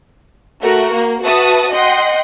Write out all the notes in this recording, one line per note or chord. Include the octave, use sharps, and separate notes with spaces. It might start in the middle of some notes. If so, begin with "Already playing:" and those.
A3 F#4 A#4
A#3
F#4 B4 E5 A5 D#6
D#5 F#5 G5 C6